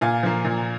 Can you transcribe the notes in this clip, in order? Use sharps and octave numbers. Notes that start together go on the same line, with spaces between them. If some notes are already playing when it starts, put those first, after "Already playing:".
A#2 F5 G#5
F3 A#3
A#2